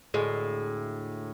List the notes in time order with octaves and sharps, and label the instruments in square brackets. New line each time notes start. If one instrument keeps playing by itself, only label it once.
[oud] D2 A2 G#3